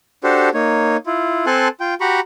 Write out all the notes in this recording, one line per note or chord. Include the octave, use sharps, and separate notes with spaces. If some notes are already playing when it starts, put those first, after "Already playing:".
D4 F#4 G4 A4 C5
A#3 D#4 C#5
E4 F4
C4 A4 G#5 A5 C6 F#6
F4 G5
F#4 G4 A#5 B5 C#6